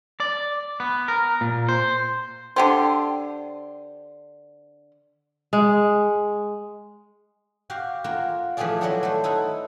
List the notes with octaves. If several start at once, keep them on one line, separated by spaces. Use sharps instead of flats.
D5
B3
A#4
A#2
C5
D3 G4 C5
G#3
F#4 G4 F5 G5
A#3 F4 F#4
E3 F3 A3 G4 G#4 D5
F#3 G3 E4 G4 C#5
A3 C5
D#4 E4 A4 B4